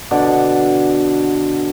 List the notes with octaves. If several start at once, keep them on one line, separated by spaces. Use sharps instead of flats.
B2 D3 D5 F#5